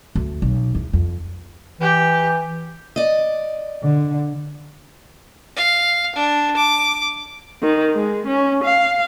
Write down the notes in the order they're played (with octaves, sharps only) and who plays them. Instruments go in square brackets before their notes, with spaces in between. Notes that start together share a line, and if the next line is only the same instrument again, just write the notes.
[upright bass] D2
B1
E2
F2
[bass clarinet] E3 [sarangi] G4
[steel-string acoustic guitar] D5 D#5
[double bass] D3
[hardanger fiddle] F5
D4
D6
[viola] D#3
G#3
C#4
F5